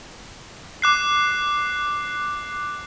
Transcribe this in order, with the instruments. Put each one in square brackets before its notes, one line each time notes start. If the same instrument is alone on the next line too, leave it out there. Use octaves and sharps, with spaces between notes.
[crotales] D6 F#6 C7